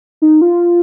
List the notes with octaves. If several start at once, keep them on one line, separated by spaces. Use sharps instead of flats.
D#4
F4